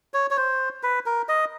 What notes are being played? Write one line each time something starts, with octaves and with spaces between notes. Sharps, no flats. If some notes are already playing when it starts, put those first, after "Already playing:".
C#5
C#5
C5
B4
A#4
D#5